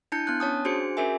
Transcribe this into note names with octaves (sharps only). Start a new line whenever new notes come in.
D4 E4 A5 G6 C#7
B3 D4 F#6
C#4 C#5 A5 D#6
D4 F#4 G#4 C5 C#7
C#4 F#4 G#4 A#4 E5 G#5